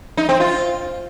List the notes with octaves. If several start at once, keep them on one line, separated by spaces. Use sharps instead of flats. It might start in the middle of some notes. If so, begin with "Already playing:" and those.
D#4
C4
F4